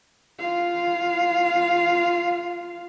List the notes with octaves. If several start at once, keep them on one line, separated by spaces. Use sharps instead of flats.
F4 F5